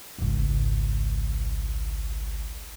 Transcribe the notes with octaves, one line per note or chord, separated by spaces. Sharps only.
G#1 C#2